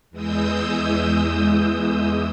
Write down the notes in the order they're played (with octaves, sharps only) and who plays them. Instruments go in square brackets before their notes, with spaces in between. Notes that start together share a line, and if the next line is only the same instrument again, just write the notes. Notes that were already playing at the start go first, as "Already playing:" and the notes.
[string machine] E2 E3 G#3 D#6 E6 G6